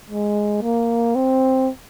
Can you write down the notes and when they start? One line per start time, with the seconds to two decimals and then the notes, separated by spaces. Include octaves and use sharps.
0.10 G#3
0.62 A#3
1.15 C4